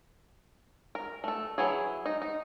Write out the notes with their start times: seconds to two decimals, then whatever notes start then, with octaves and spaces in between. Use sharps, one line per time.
0.95 A#4
1.24 A3 A4
1.58 E3 F#3 E4 G#4
2.06 D#4
2.22 D#4